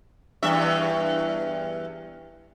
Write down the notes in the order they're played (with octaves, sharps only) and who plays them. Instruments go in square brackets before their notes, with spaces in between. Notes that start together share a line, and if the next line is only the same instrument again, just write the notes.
[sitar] E2 G2 E5